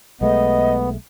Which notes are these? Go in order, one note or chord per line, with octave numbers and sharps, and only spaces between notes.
B1 G#3 A3 B3 D#5